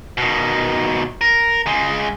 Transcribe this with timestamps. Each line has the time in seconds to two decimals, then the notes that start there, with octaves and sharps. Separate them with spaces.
0.18 B2 D#3
1.21 A#4
1.67 C#3 G#3